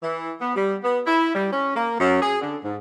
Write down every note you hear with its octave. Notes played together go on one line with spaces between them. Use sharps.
E3
B3
G3
B3
E4
G3
C#4
A#3
F#2
G#4
D3
G#2